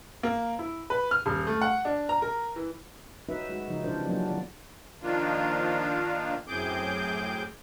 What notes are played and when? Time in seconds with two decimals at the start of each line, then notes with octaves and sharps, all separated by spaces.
0.23 A#3
0.59 E4
0.90 B4
1.11 F6
1.26 D#1
1.47 A3
1.62 F#5
1.85 D4
2.09 A#5
2.22 A#4
2.56 E3
3.29 C#4 D#4 F#4 B4 E5
3.50 G#3 F#4
3.68 C#3 F3 D#4
3.84 C3 E3 D4 A#4 C5 D5
4.07 F3 F#3 A#3 B3 C#4 D4
4.26 D#3 E3 D5
5.01 D#3 F3 A#3 D4 F4
6.48 F#2 A2 C4 G#4 D6 G6